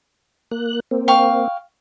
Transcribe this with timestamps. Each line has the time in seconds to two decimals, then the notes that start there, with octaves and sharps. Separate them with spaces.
0.51 A#3 F#6
0.91 A#3 C4
1.08 F5 G5 C#6